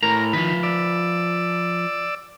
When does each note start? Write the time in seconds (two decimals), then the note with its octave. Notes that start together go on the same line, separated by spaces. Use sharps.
0.03 A2 A#4 A#5
0.33 D#3 F3 B4
0.63 D5 E6